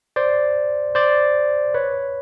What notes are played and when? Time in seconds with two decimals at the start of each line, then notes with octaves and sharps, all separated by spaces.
0.16 C5 D5
0.95 C5 D5
1.74 B4 C#5